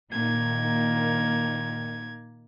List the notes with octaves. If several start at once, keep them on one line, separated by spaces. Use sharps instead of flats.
A#2 D#3 A#3 G#6